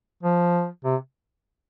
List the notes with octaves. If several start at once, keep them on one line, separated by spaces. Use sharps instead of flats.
F3
C3